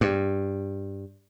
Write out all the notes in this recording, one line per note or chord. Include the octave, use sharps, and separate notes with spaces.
G2